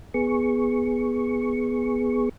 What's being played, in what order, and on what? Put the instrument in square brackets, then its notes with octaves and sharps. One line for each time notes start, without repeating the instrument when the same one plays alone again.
[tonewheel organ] B3 G#4 C#6